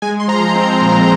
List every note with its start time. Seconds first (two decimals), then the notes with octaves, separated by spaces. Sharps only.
0.02 G#3 G#5
0.20 C6
0.28 F3 A#5
0.55 C4
0.82 A#2